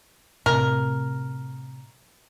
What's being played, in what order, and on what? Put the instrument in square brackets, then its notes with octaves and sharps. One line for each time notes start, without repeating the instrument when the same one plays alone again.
[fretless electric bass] A2 C3 [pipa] A#4